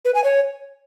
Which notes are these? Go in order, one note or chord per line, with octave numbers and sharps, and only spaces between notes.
B4
G#5
C#5